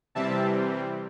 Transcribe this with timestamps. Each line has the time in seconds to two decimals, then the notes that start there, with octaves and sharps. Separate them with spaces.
0.15 C3 E3 G3 C4 E5 A5